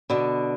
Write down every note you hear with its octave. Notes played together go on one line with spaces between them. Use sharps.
B2 D3